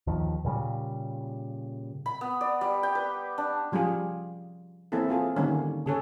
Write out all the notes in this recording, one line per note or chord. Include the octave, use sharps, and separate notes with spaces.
D#2 D#3 F3
A#2 C#3 G3
B5
B3
D5
G3
G5
B4
D4
F3 G3 C#4 F4 G#4
E3 A#3 C4 E4 G#4 A4
C4 F4 G#4 A4
D3 D#3 G3 A#3 C#4
C#3 G#4 A4 C#5